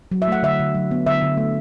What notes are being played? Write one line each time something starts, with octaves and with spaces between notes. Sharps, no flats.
F#3
E5
A3 F#5
D3 E5
D3
F#3
B3
D3 E5
D3
A3